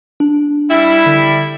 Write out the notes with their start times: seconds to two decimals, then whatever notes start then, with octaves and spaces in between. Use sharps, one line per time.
0.20 D4
0.71 G3 E4
1.06 D3